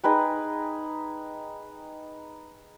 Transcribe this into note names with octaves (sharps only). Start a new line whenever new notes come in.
D#4 G#4 B4 G5